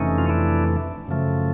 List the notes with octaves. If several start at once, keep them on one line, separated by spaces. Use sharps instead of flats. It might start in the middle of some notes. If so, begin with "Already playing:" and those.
Already playing: F2 C3 E3 A3 C#4 D#4
F4
D4 E4
F#2 C#3 F3 A3